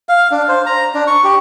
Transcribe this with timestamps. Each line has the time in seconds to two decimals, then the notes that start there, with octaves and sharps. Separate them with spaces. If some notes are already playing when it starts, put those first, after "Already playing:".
0.09 F5
0.31 D4
0.49 C5
0.66 A#5
0.95 D4
1.07 C#6
1.24 G4